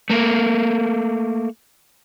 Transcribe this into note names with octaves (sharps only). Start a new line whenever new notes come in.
A3 A#3